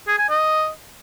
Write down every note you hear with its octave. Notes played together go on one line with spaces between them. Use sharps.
G#4
G#5
D#5